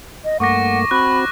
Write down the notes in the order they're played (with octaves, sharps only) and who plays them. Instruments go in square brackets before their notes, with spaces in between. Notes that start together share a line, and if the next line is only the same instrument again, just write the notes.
[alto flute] D#5
[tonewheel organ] G2 A3 A#3 [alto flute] F#5 [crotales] C#6 D6 A#6
[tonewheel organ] C4 F#4 [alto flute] B5 [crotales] F#6